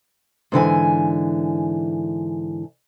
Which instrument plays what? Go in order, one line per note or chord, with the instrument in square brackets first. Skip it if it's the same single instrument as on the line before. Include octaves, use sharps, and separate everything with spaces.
[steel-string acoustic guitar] G#2 D3 E3 G#5